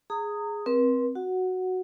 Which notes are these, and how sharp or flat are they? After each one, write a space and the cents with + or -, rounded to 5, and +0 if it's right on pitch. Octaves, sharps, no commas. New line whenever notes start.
G#4 +0 A#5 -30 D#6 +0
C4 +0 B4 -45
F#4 +0 F#5 -5